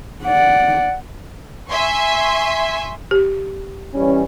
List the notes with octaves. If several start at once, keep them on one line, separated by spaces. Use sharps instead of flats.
D5 F#5
E5 G#5 C6 C#6
G4
E3 G3 C#4